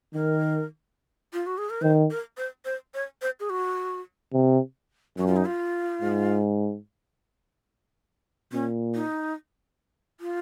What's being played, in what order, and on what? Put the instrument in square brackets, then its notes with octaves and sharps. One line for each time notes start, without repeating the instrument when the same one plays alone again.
[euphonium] D#3 [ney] A#4
[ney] F4
F#4
G#4
A#4
[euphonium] D#3 [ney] C5
[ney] A#4
C5
C5
C#5
C5
G#4
F#4
[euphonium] C3
[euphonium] F#2 [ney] F#4
[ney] F4
D#4
F4
[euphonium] G#2
[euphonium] A#2 [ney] C#4
[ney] D#4
F4